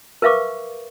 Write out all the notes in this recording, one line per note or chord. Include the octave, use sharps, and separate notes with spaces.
A#4 B4 E5 F5 C#6 D6